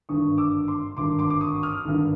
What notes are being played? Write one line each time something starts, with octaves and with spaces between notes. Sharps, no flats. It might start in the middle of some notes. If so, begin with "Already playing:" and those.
G#1 G2 D3 C#6 D#6
D6 E6
C6 D6
G#1 G2 D3 C6 D6
C6 D6
D6
C#6 D#6
D#6 F6
G#1 G2 D3